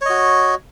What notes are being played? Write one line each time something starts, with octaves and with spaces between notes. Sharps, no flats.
F#4 C#5 D#5